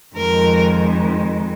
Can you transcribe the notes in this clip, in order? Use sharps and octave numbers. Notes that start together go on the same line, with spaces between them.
F2 D#3 G#3 A#4